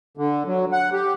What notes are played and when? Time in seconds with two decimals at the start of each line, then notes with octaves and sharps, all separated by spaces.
0.17 D3
0.47 F#3
0.72 F#5
0.93 G4